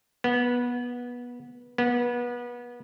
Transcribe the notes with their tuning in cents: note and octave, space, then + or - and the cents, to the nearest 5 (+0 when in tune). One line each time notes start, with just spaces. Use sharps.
B3 -20
B3 -30